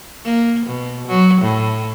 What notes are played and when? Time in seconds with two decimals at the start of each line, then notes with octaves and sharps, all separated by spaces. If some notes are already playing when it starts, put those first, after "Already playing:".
0.25 A#3
0.66 B2
1.08 F#3
1.42 A2